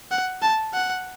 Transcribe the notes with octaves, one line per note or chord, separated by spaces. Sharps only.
F#5
A5
F#5